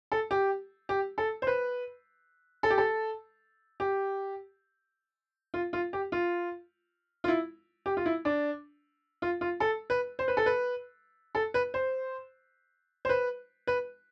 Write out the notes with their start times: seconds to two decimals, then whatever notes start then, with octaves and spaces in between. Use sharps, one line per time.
0.12 A4
0.31 G4
0.89 G4
1.18 A4
1.42 C5
1.47 B4
2.63 A4
2.70 G4
2.78 A4
3.80 G4
5.54 F4
5.73 F4
5.93 G4
6.12 F4
7.24 F4
7.28 E4
7.86 G4
7.97 F4
8.06 E4
8.25 D4
9.22 F4
9.41 F4
9.60 A4
9.90 B4
10.19 C5
10.28 B4
10.37 A4
10.46 B4
11.35 A4
11.54 B4
11.74 C5
13.05 C5
13.09 B4
13.67 B4